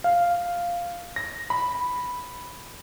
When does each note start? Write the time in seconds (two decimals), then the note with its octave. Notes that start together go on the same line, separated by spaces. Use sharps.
0.04 F5
1.16 A#6
1.50 B5